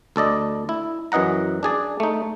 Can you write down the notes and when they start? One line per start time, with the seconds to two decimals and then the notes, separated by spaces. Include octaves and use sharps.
0.16 D2 A4 D5 D#5
0.69 E4
1.12 F#2 E3 D#5 F#5 A#5
1.63 D4 G#4 D5
2.00 A3 D#4